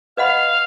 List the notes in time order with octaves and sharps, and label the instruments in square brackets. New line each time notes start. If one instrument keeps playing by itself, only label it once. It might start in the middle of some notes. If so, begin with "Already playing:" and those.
[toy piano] B4 D#5 F#5 B5 [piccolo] F5